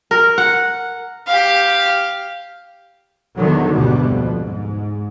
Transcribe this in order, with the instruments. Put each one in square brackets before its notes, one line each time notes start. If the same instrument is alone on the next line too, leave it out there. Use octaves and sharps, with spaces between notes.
[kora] A#4
F#5
[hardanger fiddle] G4 F5
[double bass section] E2 D3 D#3 F#3
D2 G#2 B2 G3
F2
G#2